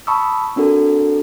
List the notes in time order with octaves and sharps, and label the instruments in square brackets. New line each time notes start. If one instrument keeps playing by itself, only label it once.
[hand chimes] A5 B5 C#6 D#6 E6
C4 D4 F#4 A4 A#4